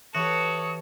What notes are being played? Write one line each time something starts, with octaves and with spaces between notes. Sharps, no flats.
E3 F#4 G4 A4 C#5 D#6